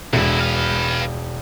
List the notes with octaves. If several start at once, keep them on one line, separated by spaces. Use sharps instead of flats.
E1 D3 E4
B4 F5